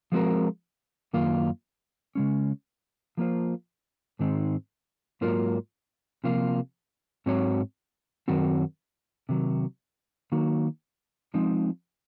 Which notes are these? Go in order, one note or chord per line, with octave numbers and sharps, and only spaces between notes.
F3 G#3 C4 F#4 A#4
F#2 D#3 A#3 F4
C#3 G#3 C#4
F3 A#3 F4 C5
G#2 D#3 G#3 C4 D#4
G#2 F#3 A#3 F4 A#4
C3 F3 A#3 F4
G#2 F#3 C4 F#4 C#5
F#2 D#3 F#3 C4 F#4
C3 D#3 F#3
D#3 F#3 A#3 D#4 F#4
F3 G#3 C4 D#4